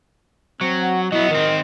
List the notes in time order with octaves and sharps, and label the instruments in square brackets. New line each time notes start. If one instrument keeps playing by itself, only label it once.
[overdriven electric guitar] F#3 [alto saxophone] C4
[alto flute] F#5
[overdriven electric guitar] F#3 B3 [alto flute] E4 [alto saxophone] D#5
[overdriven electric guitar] D#3 C4 [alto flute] A#4